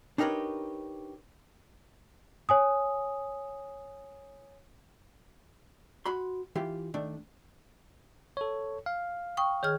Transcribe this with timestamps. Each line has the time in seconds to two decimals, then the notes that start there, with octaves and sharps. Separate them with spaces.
0.18 D4 D#4 G4 A#4 B4 C#5
2.49 C#5 G#5 D#6
6.06 F#4 B5 C6
6.56 E3 F4 G4
6.94 D#3 A3 D4
8.37 A4 C#5
8.86 F5
9.37 G5 C#6 D#6
9.63 D#3 G#4 C#5 F6